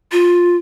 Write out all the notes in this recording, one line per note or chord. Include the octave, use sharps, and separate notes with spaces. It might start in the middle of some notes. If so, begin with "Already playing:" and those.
F4